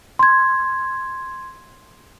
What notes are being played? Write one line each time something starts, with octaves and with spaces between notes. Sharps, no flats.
C6 G#6